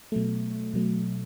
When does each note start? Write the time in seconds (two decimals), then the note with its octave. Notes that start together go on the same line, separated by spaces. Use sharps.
0.12 B2 F#3 A3
0.74 B2 F#3 A3